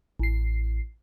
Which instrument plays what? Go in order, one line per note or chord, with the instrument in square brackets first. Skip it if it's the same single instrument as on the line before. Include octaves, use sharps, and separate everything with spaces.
[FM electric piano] A1 C7